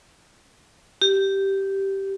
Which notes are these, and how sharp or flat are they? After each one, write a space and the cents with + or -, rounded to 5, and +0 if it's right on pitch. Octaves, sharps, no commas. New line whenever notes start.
G4 -10